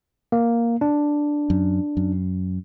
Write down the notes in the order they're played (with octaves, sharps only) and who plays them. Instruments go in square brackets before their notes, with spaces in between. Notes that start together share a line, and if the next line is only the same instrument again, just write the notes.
[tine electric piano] A#3
D4
[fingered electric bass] F#2
F#2